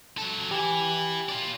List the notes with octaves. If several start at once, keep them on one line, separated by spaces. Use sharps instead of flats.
F#3 A4
E3 E4 G4 G5 G#5
F4 D5